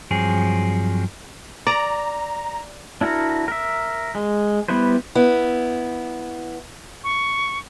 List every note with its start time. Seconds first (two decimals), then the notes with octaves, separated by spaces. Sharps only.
0.11 G2 F3 F#3 C4 G#4
1.67 D5 A#5
3.01 D4 E4 F#4 A#4
3.48 A#4 E5
4.15 G#3
4.68 G3 B3 E4 B4 C5
5.15 B3 E4
7.04 C#6